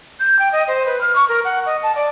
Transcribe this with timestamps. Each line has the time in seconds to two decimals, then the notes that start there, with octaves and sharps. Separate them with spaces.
0.20 G6
0.39 G5
0.52 D#5
0.68 C5
0.86 B4
1.01 F6
1.15 C#6
1.29 A#4
1.45 F#5
1.66 D#5
1.83 A5
1.96 D5